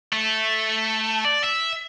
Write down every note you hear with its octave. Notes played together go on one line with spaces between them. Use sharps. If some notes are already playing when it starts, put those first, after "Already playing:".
A3
D5
E5